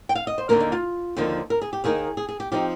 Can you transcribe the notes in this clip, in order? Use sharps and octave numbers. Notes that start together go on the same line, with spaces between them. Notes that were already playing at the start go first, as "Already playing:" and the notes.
G5
F5
D#5
C5
D#2 D3 F3 A#3 A#4
D#4
F4
D#2 D3 F3 A#3 D#4
A#4
G#4
G4
D#2 D#3 A#3 D#4 G#4
G#4
G#4
G4
F3 C4 D#4 G4